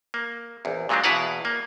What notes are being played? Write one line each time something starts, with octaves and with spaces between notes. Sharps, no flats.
A#3
A#1 E2
A#2 F#3 G#3 C4 D4
E2 B2 E4 B4 F5 F#5
A#3